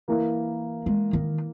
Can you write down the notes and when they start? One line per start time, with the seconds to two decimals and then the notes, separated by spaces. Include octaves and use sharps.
0.08 E3 A#3 E4 A#4
0.86 G#3
1.13 D#3